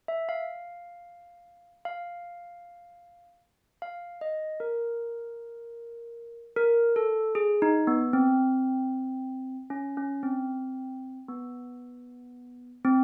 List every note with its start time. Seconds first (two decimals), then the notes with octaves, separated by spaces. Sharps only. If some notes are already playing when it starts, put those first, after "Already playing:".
0.08 E5
0.29 F5
1.85 F5
3.82 F5
4.21 D#5
4.60 A#4
6.56 A#4
6.96 A4
7.35 G#4
7.62 D#4
7.87 B3
8.13 C4
9.70 C#4
9.97 C#4
10.23 C4
11.28 B3
12.85 C4